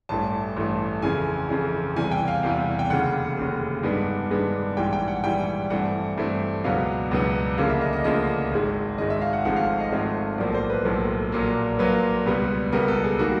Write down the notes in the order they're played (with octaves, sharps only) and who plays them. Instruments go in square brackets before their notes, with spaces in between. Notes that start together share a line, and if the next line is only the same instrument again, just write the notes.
[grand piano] A1 G2 E3 A3 A5
A1 G2 E3 A3
F2 C#3 E3 G#5
F2 C#3 E3
E2 C3 E3 G3 G#5
G5
F5
E2 C3 E3 G3 F5
G5
F1 D#2 C#3 F#5
F1 D#2 C#3
G2 D#3 G#3 B3 D4
G2 D#3 G#3 B3 D4
A#1 G#2 E3 G3 G5
G5
F#5
A#1 G#2 E3 G3 G5
G2 E3 A3 C4 F#5
G2 E3 A3 C4
C#2 B2 F#3 B3 D4 F5
C#2 B2 F#3 B3 D4
D2 C#3 F3 A#3 D4 F5
E5
D#5
D#5
D2 C#3 F3 A#3 D4 D#5
G#1 G#2 D#3 G#3
G#1 G#2 D#3 G#3 D#5
E5
F5
F#5
G#1 G#2 F3 A3 C4 F#5
F5
D#5
G#1 G#2 F3 A3 C4
B1 A2 F3 A#3 D5
C5
B4
B1 A2 F3 A#3
A#1 A#2 F#3 A#3
A#1 A#2 F#3 A#3 B4
C#2 B2 G3 B3
C#2 B2 G3 B3 A#4
A4
G#4
D#3 G3 A#3 F#4